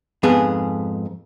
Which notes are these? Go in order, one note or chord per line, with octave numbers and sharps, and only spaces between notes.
F2 G#2 B3 G#4